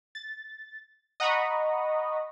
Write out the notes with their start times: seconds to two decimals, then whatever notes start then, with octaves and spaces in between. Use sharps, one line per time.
0.15 A6
1.20 D#5 F#5 A#5 B5 C#6 D#6